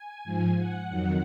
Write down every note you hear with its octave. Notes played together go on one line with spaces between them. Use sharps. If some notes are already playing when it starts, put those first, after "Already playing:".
Already playing: G#5
G#2 F3
F#5
F2 D#3 F#3